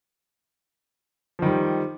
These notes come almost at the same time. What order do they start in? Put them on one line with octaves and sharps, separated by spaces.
F3 D#3 G3